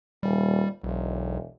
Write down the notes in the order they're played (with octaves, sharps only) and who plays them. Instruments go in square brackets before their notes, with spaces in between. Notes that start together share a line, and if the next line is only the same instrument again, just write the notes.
[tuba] D#1 [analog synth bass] G3
[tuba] E1 [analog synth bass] B1